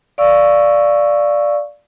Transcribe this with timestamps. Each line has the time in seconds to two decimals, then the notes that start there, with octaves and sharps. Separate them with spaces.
0.18 D5 F5 C#6 E6